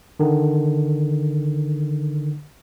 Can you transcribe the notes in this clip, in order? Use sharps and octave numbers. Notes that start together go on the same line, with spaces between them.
D3 D#3